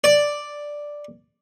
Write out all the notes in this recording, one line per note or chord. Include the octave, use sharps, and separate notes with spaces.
D5